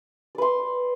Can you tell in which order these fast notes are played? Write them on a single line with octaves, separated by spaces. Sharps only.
D5 B4 C6